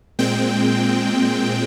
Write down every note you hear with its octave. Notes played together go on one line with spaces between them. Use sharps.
A#2 G#3 C4 G5